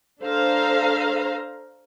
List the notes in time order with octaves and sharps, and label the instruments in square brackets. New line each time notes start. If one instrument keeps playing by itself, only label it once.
[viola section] D4 A4 C5 F5 A#5